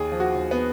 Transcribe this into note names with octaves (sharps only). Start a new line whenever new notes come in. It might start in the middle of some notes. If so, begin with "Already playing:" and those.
Already playing: D#2 G#4
F3
F#4
D#2
B3